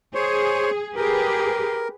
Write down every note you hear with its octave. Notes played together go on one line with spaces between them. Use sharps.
G#4 C5 C#5
G4 G#4 A#4 B4